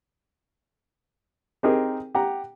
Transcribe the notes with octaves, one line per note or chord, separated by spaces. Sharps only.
C4 D#4 G4 G#4 A#4
G4 F#5 A#5